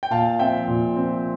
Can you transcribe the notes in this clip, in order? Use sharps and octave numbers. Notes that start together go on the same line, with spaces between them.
G5
A#2 F5 A5
F3 C4 E5 G5
A#2
F3 C4